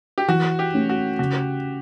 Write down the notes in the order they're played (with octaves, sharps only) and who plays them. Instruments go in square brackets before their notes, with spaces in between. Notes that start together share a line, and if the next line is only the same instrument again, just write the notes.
[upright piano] G4
[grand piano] E3 [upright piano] F#4
[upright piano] G4
[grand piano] A3 C#4
[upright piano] F#4
[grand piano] C#3 [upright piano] F#4